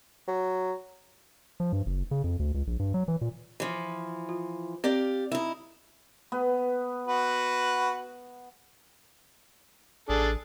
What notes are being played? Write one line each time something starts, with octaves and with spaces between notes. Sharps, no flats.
F#3
F3
G2
F#1
C#3
F2
D2
C#2
A#1
G2
F#3
E3
A#2
E3 F3
F4
C4 G4 D5 F5
D#4 E4
B3
F#4 B4
A1 D4 G#4 A4